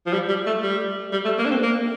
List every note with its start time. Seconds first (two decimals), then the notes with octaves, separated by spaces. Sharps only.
0.07 F3
0.13 G3
0.29 G3
0.47 A3
0.63 G3
1.13 G3
1.25 A3
1.38 A#3
1.46 D4
1.51 C4
1.63 A#3